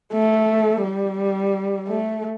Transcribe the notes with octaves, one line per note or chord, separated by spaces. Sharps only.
A3
G3
A3